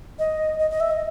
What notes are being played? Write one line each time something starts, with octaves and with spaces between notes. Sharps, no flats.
D#5
D#5
D#5
E5
D#5